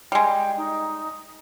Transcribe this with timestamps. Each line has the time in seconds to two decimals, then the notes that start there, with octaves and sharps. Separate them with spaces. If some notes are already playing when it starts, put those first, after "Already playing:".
0.12 G3 G#3 G5
0.57 D#4